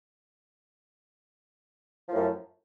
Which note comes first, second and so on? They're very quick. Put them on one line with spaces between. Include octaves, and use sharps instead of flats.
F3 A2 F#2